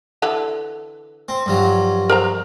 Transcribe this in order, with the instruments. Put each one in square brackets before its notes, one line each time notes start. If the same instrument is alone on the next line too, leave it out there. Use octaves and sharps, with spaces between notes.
[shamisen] D3 E3 A4
[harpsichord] C4
G2 F3 F#3
[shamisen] A#4 C5 A#5